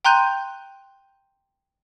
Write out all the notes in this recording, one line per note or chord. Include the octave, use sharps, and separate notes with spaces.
G5 A#5 C6 F#6 G6 D#7